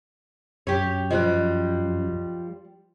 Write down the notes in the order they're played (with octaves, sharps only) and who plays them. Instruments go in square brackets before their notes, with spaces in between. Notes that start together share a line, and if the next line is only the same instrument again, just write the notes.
[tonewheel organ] F#2 [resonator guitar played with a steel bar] G4 C#5
[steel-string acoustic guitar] F3 G3 [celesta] D#5 F#6